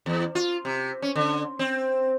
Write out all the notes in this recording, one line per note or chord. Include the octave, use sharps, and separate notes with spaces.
E2
F4
C3
C#4
D3
C4